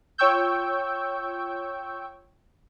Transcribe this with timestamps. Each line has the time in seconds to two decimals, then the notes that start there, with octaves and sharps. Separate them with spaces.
0.18 F4 C#5 G5 C#6 E6 G6